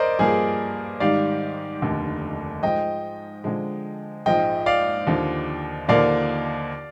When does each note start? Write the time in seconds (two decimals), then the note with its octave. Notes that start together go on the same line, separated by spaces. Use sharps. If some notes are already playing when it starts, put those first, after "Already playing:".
Already playing: A#4 C5 D5 D#5
0.19 G2 F3 A#3 G#4
1.00 G#2 D#3 G3 D5 F5
1.82 F1 D#2 D3
2.63 G#2 F3 G#3 D#5 G5
3.44 D3 F3 G#3
4.26 A#1 G#2 F3 G#3 D#5 G5
4.66 D5 F5
5.07 D#2 D3 F3
5.88 D#2 D3 F3 A#3 D4 D5 F5